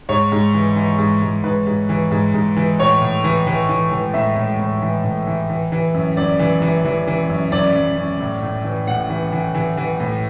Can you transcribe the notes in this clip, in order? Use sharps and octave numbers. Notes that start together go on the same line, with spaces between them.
G#2 C#5
G#2
E3
E3
G#2
G#2
G#2 B4
G#2
E3
G#2
G#2
E3
A2 C#5
A2
E3
E3
E3
E3
A2 E5
A2
A2
E3
A2
E3
E3
E3
F#2
F#2 D5
E3
E3
E3
E3
F#2
F#2 D5
F#2
F#2
A2
A2
E3
A2 F#5
E3
E3
E3
E3
A2